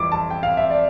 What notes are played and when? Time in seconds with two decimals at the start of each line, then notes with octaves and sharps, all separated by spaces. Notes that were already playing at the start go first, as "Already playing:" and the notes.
Already playing: F2 E3 G3 D6
0.12 A5
0.30 G5
0.43 F5
0.57 E5
0.70 D5